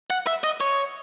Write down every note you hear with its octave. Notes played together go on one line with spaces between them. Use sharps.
F#5
E5
D#5
C#5